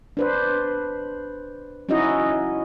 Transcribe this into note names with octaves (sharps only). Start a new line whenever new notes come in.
D4 B4 C5
C#4 D#4 E4 F#4 D#5